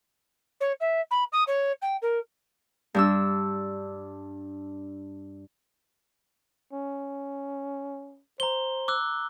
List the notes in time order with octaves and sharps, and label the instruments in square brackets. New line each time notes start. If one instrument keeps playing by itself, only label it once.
[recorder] C#5
E5
B5
D#6
C#5
G5
A#4
[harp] G2 D4 E6
[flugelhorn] C#4
[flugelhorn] C5 [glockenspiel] A#5 G7
[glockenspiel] D6 E6 F#6